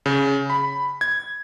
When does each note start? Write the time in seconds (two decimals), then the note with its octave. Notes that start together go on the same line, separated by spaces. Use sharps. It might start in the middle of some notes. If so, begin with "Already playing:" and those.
0.06 C#3
0.50 B5
1.01 G#6